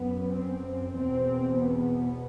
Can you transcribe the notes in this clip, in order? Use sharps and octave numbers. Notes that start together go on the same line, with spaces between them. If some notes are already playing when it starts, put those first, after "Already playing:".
Already playing: F#2 B3
C4
E2 B2 C4
B3